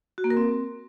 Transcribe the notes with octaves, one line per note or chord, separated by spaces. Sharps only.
F#4
A#3
A#4
C4